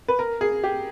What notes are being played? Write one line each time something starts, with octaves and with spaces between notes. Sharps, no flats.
B4
A#4
G#4
G4